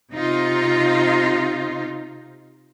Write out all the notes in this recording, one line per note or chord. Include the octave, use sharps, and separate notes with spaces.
C3 D#4 F4